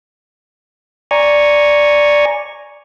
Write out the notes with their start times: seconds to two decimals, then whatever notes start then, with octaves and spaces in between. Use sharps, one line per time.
1.11 D5 G#5 A#5 C#6